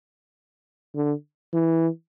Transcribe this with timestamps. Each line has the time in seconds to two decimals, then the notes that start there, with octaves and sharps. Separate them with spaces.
0.95 D3
1.53 E3